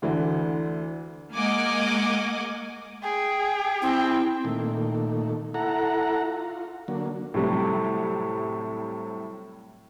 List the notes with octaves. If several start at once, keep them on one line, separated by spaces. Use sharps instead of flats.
D2 D3 E3
G#3 A#3 D#5 F#5 G#5 D6
G#4 G5
C4 E4
A#2 D#3 A3
E4 A4 F#5 A#5
F4
D3 F#3 A#3
A2 C3 F#3 G3